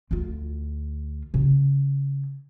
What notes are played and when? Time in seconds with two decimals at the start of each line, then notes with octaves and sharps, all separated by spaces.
0.11 D2 F4
1.34 C#3